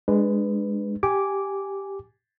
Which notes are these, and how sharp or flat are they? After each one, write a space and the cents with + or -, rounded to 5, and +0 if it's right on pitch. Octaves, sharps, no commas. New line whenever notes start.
G#3 +0 D4 +20 B4 +10
G4 +0 G#5 +0 D6 -5